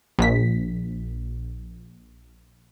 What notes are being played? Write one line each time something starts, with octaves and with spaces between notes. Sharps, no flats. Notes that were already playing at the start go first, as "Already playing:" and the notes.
A#1 B6